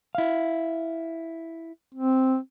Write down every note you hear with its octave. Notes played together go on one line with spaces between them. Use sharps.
E4 F5
C4